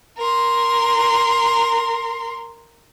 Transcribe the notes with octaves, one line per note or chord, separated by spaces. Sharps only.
A#4 C6